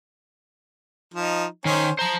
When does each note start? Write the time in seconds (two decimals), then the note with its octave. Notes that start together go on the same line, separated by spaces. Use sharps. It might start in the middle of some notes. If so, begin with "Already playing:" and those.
1.14 F3 D#4
1.65 D#3 C#4 C5
1.99 C5 A5 A#5